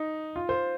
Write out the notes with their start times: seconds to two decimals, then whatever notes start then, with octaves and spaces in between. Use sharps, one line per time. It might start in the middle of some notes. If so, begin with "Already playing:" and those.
Already playing: D#4
0.36 F4
0.49 C5